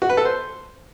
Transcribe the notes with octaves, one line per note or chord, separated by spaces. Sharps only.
F#4
B4
A4
C5